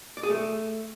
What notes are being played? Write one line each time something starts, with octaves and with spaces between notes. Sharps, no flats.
D5
G#4
A3